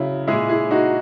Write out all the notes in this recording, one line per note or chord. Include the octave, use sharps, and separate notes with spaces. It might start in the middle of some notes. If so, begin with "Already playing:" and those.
Already playing: C#3 F#3 E4
A#2 G#3 E4 G#4
E4 G#4
D#4 F#4